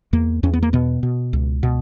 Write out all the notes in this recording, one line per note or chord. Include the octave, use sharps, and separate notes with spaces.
E2 A#3
E2 C#4
B3
A#3
B2 B3
B2
C#2
B2